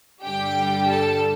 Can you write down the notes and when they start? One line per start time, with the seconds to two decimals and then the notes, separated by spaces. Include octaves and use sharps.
0.24 G2 D3 G3 G4 G5
0.89 A4 A5